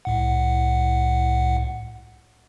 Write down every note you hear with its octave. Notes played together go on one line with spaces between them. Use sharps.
C2 A2 F#5